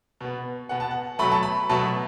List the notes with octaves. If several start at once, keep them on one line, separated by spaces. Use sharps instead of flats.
B2 B3
B2 B3 F#5
A5
F#5
B2 F#3 A3 B5
A5
B5
B2 F#3 A3 A5